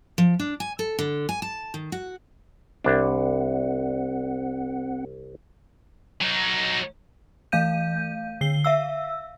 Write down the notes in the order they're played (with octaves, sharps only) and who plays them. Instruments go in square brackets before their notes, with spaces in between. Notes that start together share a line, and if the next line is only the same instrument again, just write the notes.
[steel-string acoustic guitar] F3
D4
G#5
A4
D3
G#5
A5
D#3
F#4
[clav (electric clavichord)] C2 D4 [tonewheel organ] C4 F#5
[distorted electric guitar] F#3 D#4
[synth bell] E3 A3 F5 G6 D#7
D3 C7 G7
E5 F5 E6